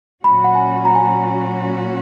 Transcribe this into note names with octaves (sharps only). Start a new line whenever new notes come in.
A#2 F#3 C#4 F#4 B5
F#5
G#5
A#5
G#5
A#5